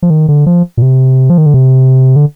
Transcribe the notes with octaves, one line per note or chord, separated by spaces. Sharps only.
F3
D#3
D3
F3
A#2
C3
F3
D#3
D3
C3
D3